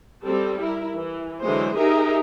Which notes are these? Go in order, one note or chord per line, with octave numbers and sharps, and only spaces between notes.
G3 C4 A4
E4 A#4
E3
D3 E3 F#3 G#3 C5
D#4 G4 G#4 A#4 E5